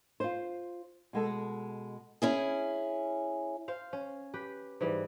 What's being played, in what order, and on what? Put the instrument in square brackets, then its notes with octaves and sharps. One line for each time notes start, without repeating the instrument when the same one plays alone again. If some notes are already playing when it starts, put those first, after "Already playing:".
[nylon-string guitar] F4 C5
B2 G#3 A4
[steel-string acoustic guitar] C#4 E4 G#4
[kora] C5 F5
C#4
G4 B4
G#2 E3 G3